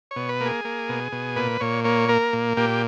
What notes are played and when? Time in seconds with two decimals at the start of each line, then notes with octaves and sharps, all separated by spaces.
0.11 C#5
0.16 B2
0.29 B4
0.41 A#3
0.46 G#4
0.65 A#3
0.89 B2
1.12 B2
1.36 A#2 B4
1.60 A#2 C#5
1.84 A#3 C#5
2.08 A#3 A#4
2.33 A#2
2.57 A#2 G4